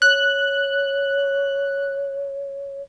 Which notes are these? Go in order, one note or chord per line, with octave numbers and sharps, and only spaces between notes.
C#5 F#6